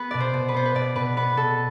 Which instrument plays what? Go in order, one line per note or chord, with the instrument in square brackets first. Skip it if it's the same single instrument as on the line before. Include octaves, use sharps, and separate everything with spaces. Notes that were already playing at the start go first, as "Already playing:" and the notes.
Already playing: [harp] B3 B4
B2 D5
C5
B2
B4
B3 C5
B4
B2 D5
B2 B4
B3 B4
B2 A4